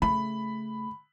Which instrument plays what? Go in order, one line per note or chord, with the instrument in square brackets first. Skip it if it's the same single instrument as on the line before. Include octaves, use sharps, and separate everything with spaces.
[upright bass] C#3 A3 [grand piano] B5